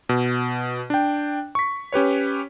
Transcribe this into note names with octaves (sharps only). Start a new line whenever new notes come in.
B2
D4 G5
C#6 B6
C#4 G4 B4 C#5